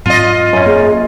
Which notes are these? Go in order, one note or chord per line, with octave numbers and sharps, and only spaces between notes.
G#2 F#3 C4 F4 D#5
F#2 C#4
A#3 G#4